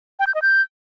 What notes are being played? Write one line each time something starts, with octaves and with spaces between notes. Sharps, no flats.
G5
G6
D#5
G6